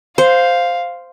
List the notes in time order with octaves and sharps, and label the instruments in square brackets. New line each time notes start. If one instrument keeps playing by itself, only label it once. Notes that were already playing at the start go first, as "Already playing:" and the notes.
[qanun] C5 [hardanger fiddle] F5